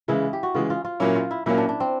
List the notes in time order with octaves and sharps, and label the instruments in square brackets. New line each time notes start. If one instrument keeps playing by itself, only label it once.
[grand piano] C#3 E3 G#3 [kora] E4
[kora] G4
F#4
[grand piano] C#3 E3 G#3 [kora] F4
[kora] F4
F4
[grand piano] A#2 F#3 A#3 C#4 [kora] E4
[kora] F4
E4
[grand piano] A#2 F#3 A#3 C#4 [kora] E4
[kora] D4
D4
C4